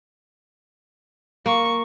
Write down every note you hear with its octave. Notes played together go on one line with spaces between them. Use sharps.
A#3 C#6